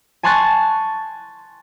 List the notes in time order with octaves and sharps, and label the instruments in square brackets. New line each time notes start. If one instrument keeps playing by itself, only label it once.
[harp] G#5 A5 C6 C#6 F#6 A6